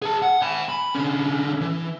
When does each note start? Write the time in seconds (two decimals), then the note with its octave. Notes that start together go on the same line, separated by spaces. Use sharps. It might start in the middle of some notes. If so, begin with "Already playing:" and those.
0.02 G#4 A5
0.22 F#5
0.42 G#5 B5
0.69 B5
0.95 D3 C#4
1.61 E3